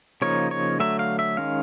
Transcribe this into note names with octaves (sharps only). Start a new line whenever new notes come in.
C#3 F3 A#3 D#4 C#5
C#5
D3 F#3 A3 E5
F5
E5
D#3 G#3 C#4 F5